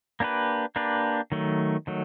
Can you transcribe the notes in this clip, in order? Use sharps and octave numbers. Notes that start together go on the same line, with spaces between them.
A#3 D4 G4 B4
A#3 D4 G4 B4
D#3 F#3 A3
D#3 F#3 A3